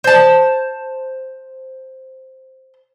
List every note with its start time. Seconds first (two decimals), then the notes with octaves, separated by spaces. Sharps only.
0.04 C5 A5